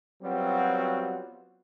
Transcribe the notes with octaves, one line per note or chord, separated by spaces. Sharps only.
F#3 G3 B3 C4 F4 F#4